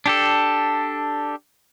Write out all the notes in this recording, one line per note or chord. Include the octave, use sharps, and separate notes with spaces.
D4 G4 A4